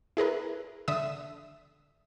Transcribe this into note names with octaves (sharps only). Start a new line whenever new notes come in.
E4 G#4 A#4 B4
D3 E5 D#6